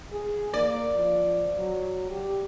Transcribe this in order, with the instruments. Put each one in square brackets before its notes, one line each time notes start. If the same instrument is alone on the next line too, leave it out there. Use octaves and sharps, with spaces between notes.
[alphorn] G#4
[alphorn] A#3 [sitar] D5
[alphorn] F3
F#3
G4